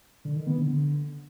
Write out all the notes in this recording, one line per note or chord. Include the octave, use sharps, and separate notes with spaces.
D3
D#3
B3
D3